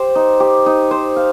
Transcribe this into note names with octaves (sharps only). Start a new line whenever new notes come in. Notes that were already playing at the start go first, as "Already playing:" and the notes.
Already playing: G4 C5
D#4
G4
D#4
C5
F5